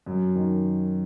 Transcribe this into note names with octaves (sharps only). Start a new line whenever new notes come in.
F#2
D#3